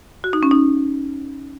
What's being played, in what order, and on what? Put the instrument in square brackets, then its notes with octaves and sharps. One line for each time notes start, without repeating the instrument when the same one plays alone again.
[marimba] F#4
D#4
C#4
D#4